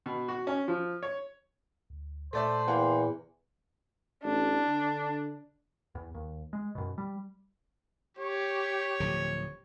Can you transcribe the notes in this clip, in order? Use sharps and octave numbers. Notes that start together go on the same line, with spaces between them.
B2
F#4
C#4
F3
C#5
D2
A#2 A3 C5 D5 E5
E2 A#3 F#5 G5
A1 D4
D3
E2
D#2
G#3
F#2 B2
G3
G4 C#5
D1 D3 F3